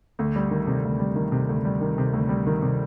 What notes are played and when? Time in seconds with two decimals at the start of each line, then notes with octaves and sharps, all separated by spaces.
0.19 D2
0.36 G3
0.51 D#3
0.67 C3
0.84 D2
1.00 G3
1.16 D#3
1.32 C3
1.49 D2
1.65 G3
1.81 D#3
1.98 C3
2.13 D2
2.29 G3
2.47 D#3
2.62 C3